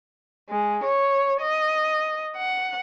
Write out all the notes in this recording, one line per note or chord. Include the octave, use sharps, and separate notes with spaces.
G#3
C#5
D#5
F#5